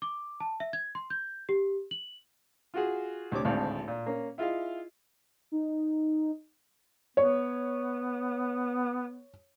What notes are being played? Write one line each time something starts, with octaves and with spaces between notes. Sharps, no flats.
D6
A5
E5
G#6
C6
G6
G4
F#7
F4 F#4 G#4
D2 C3 C#5 D6
G#1 D2 A2 C4 D5 F5
A#2
A#3 C#4
E4 F4 G#4 D#5 F5
D#4
B3 C#5